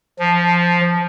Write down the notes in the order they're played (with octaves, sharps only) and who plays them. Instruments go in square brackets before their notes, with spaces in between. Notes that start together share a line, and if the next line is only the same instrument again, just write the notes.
[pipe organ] F3